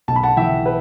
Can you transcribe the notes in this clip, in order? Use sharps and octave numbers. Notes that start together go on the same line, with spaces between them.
B1 A5
B5
F#5 A5
E3 E5 G5
B4